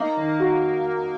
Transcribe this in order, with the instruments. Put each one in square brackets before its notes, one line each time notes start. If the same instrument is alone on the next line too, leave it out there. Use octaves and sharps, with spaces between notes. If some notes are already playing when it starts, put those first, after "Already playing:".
Already playing: [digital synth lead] A#3 [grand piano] D#4
[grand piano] D#3
F#4